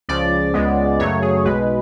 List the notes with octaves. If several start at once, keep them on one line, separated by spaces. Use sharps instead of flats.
C#2 C#3 F3 D5
C#2 C#3 G#3 B3
F#2 C#3 F#3 A3 C#5
G#4
B1 B2 G#3 B4